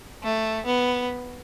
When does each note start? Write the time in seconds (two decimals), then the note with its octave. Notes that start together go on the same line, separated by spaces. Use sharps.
0.23 A3
0.66 B3